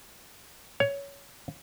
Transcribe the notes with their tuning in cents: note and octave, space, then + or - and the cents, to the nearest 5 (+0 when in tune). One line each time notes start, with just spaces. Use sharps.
C#5 +15